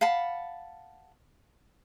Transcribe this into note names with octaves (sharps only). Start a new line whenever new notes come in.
F5 F#5 A5 B5